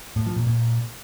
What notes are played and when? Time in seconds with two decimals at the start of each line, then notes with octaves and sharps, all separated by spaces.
0.16 A2
0.26 F3
0.36 A#2
0.46 A#2